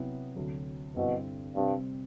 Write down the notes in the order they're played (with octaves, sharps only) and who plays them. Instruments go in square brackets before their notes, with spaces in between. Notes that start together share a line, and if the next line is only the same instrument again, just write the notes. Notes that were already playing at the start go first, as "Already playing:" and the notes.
Already playing: [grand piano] C3 F#3 B3 E4
D2 C3 F#3
[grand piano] G2 D3 G3 C4 E4 [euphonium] B2
[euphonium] G2 [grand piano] C3 G3 C4